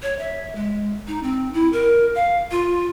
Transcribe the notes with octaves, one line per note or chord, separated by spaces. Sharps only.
C#5
E5
G#3
D#4
C4
E4
A#4
F5
F4